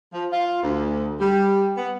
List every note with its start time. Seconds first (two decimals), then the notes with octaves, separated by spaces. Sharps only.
0.13 F3
0.31 F4
0.62 D2
1.19 G3
1.76 B3